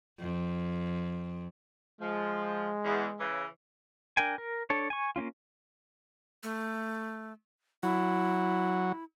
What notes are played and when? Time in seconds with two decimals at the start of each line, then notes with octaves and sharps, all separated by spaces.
0.20 F2
2.01 F3 G#3
2.84 E2
3.19 C#3 E3
4.17 D4 A#4 G5 G#5
4.38 A#4
4.70 D4 A4 C#5
4.90 G#5 C#6
5.16 A#3 C4 C#4 F4
6.43 A3
7.83 F#3 E4